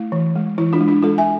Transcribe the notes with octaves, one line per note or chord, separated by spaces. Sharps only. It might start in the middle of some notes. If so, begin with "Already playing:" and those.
Already playing: A3 E4
E3
G#3
E3 E4
D4 F4
G#3
D4 F4
G#3 F4 A4
E5 G#5